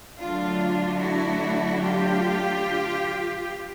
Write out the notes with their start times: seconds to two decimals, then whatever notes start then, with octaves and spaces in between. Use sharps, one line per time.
0.19 D3 F#3 A3 D4 F4
0.99 E4 F#4
1.81 F4 G4